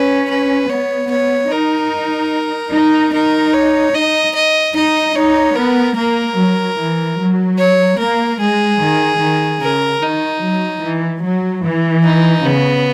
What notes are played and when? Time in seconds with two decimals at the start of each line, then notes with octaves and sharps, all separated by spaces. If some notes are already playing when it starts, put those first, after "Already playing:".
Already playing: C#4 B4
0.30 B4
0.69 B3 C#5
1.11 B3 C#5
1.51 D#4 A#4
2.73 D#4
3.13 D#4 A#4
3.54 C#5
3.94 D#4 D#5
4.35 D#5
4.75 D#4 D#5
5.15 D#4 C#5
5.56 B3 A#4
5.96 A#3 A#4
6.37 F#3
6.78 E3
7.18 F#3
7.58 C#5
7.98 A#3 A#4
8.40 G#3 G#4
8.80 D#3
9.20 D#3
9.61 C#3 A#4
10.01 D#3 D#4
10.41 F#3
10.82 E3
11.23 F#3
11.64 E3
12.04 D#4
12.44 C#3 B3